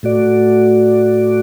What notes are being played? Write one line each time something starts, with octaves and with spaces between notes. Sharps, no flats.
A2 A3 F#4 D5